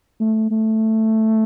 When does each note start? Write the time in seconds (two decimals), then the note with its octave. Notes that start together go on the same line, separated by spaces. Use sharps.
0.20 A3
0.51 A3